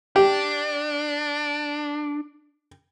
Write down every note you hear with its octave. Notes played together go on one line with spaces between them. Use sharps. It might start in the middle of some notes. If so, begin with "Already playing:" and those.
D4 G4